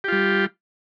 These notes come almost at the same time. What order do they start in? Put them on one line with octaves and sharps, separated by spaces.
G4 F4 G3